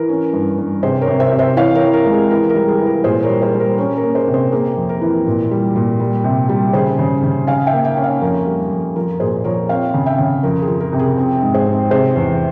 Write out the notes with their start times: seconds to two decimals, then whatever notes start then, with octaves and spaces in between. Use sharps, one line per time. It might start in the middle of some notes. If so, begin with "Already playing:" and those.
Already playing: E3 A#4
0.09 C#4
0.33 G2
0.58 G2
0.82 C3 G#4 C5
1.01 A#4 C#5
1.08 C3
1.20 C5 E5
1.32 C3
1.38 C5 E5
1.57 E3 C#5 F5
1.75 A#4 C#5
1.81 E3
1.93 A#4
2.06 G#3
2.13 G#4
2.30 E3 A#4
2.49 A#4
2.55 G3
2.68 G#4
2.80 E3
2.86 A#4
3.04 A#2 G#4 C5
3.22 A#4 C#5
3.30 G3
3.42 G#4 C5
3.54 G3
3.60 A#4
3.78 C#4 A#4 C#5
3.97 A#4 C#5
4.03 A#3
4.15 G#4 C5
4.28 C3
4.34 G#4 C5
4.52 A#3 G#4
4.76 F2
4.89 A#4
5.01 E3
5.26 A#2
5.51 G3
5.75 A#2
5.99 G3
6.24 C3
6.49 G3
6.73 C#3 G#4 C5
6.99 C#3
7.23 C#3
7.47 C#3 F5 G#5
7.66 E5 G5
7.73 A#3
7.85 E5 G5
7.97 C#4
8.03 C#5 F5
8.21 F2 A#4
8.47 G3
8.71 F2
8.96 F3 A#4
9.20 A#2 G#4 C5
9.44 F3 A#4 C#5
9.69 C4 C#5 F5
9.94 C#3
10.06 E5 G5
10.19 C#3
10.43 F2 A#4
10.62 G#4
10.68 F3
10.80 A#4
10.93 C3
10.99 G#4
11.17 C4
11.42 G#2
11.54 G#4 C5
11.66 C4
11.91 C3 G#4 C5
12.16 E2